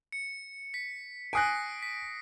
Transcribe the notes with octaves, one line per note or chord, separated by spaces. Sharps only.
C#7
B6
G#5 D#6 F#6 A#6 C7 D7
B6